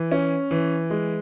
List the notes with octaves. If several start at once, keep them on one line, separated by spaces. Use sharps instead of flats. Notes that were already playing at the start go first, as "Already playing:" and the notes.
Already playing: E3
C#4
E3
G#3